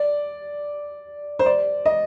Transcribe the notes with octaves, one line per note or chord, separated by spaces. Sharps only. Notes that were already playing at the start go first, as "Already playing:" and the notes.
Already playing: D5
C5
D5
D#5